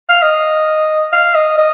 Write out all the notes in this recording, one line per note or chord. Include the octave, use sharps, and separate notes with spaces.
F5
D#5
F5
D#5
D#5